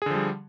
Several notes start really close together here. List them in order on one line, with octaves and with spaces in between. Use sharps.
G#4 D3 F3 G3